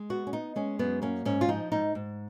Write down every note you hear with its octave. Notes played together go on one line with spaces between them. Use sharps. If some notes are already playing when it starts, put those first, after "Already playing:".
Already playing: G#3
B3 F#4
C#4
B3 D#4
G#3 C#4
F#2 B3
A#3 C#4
G#2 C#4
F4
F3 D#4
G#2 D#4
G#2